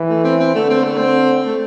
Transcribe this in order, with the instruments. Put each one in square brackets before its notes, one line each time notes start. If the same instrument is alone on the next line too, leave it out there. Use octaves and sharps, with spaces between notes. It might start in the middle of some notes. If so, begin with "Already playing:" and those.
Already playing: [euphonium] E3
[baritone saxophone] A3
C4
C4
[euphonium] D3 [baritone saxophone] A3
[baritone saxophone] C4
A3
C4
A3